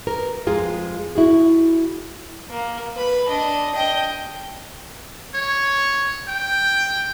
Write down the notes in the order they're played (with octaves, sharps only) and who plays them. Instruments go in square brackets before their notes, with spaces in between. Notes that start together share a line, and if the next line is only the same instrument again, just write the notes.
[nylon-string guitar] A#4
F2 G#3 F4 G#4 A#4
E4 F#4 G#4
[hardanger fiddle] A#3
B4 B5
D4 D#5
D#5 G5
[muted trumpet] C#5
G5